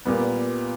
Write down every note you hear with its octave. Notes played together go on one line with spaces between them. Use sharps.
A#2 G3 B3